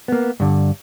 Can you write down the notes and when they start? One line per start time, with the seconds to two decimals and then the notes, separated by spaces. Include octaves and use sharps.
0.08 A#3 B3
0.40 G2 D3